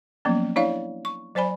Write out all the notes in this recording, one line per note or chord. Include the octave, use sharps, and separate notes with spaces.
F3 F#3 A#3 B3 C#4
D4 E4 C#5 D5 F5
C#6
F#3 C5 D5 G#5 B5